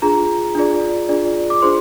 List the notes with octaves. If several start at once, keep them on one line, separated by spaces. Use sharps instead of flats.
D4 F4 G#4 A#5
D4 F4 G#4 D5
D4 F4 G#4 D5
D6
D4 F4 G#4 C5 C6